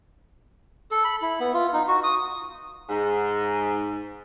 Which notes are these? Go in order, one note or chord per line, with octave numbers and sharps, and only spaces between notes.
A4
B5
E4
B3
F4
D#4
F#4
D#6
G#2